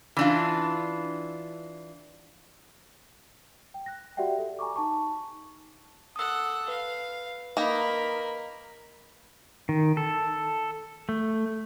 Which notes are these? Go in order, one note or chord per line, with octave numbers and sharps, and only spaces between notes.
E3 D4 F4
G5
F#6 A#6
F#4 G4 D5 E5 F#5 G5
A4
G#5 A#5 C#6 D6
D#4 A5 C#6
A4 F#5 D#6 E6
B4 F5
A#3 D#4 A#4 B5
D#3
A4
A3